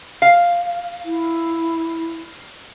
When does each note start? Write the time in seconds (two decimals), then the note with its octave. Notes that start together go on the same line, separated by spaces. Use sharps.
0.22 F5
1.05 E4